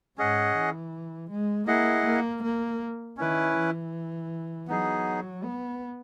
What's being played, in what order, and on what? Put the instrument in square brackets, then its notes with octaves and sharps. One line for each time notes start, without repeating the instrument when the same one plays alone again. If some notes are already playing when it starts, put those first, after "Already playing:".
[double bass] G#2 [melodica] C#4 G#4 D#5 F#5
[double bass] E3
G#3
[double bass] A#3 [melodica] E4 G#4 D#5 F#5
[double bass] A#3
A#3
[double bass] D#3 [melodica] C#4 E4 B4
[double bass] E3
[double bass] F#3 [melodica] B3 D#4 G#4
[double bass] B3